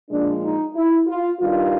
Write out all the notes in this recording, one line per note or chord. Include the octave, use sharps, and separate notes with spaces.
A#2 F3 G#3 D4
D#4
E4
F4
G2 D#3 G3 F4